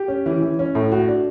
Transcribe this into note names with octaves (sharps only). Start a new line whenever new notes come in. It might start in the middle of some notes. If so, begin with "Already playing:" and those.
Already playing: G4
C#4
E3
E3
C#4
A2
F#4
D4